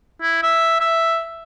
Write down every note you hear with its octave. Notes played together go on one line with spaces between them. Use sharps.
E4
E5
E5